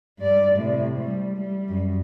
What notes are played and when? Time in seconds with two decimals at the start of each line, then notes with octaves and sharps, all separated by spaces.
0.19 G2 D5
0.55 A2 C3
0.98 G3
1.37 G3
1.69 F#2